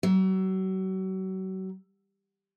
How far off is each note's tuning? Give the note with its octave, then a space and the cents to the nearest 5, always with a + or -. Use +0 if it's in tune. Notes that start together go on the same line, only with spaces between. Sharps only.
F#3 +35